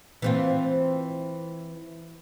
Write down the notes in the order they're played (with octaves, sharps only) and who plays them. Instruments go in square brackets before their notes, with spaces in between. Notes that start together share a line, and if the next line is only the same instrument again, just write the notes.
[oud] E3 C4 F4